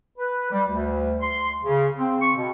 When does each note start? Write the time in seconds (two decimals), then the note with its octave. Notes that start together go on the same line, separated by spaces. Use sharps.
0.18 B4
0.51 G3
0.69 D2
1.21 C6
1.64 C#3
1.97 C4
2.21 C#6
2.36 B2